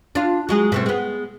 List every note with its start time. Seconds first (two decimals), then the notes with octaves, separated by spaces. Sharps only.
0.15 D4 F4
0.49 F#3 G#3 G#4
0.72 B2 A3 C4
0.86 G#3 B3